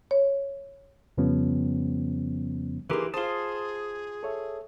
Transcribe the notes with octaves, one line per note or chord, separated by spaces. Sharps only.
C#5
F2 C#3 F3 G3 B3 C#4
E3 A#3 D#4 G4 G#4 A#4 B4 C6
F4 G#4 C5 A5 C6 D#6
A4 C#5 E5